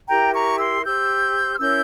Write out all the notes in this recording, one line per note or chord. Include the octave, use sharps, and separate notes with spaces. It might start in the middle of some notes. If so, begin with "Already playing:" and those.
E4 G4 A#4 G5 A#5
A#5 C#6
C6 E6
G4 C5 E6 G6
F6
C#4 E4 A#4 C#5 E6 G6